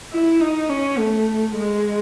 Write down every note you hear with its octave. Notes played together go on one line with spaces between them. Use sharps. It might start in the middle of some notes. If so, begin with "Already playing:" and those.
E4
D#4
C#4
A3
G#3